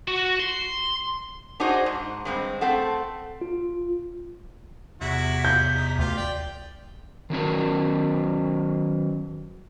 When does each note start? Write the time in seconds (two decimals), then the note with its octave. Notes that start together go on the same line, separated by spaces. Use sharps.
0.08 F#4
0.40 C6
1.60 D4 D#4 F#4 G#4 C5
1.86 G#2
2.25 G2 G#3 C4
2.61 A3 C4 A4 F#5
3.41 F4
5.01 E2 C3 E4 F#4 B6
5.45 G6
5.76 D#4
5.99 D2 F4 G4
6.17 D5 G5
7.30 D#3 F#3 C#4 A#4